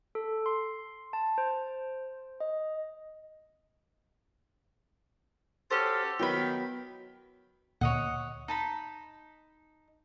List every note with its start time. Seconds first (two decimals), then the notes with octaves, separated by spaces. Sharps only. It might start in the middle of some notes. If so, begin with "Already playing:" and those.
0.15 A4
0.46 C6
1.13 A5
1.38 C5
2.40 D#5
5.71 C#4 F#4 G4 A4 C5
6.19 D#3 F#3 B3 G5 B5 G7
7.81 D2 A#2 C#5 D#5 F#5
8.48 D#4 A5 B5